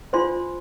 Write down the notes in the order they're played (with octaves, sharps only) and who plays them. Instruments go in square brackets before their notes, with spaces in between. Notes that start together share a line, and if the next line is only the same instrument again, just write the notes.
[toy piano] D4 F4 C5 C6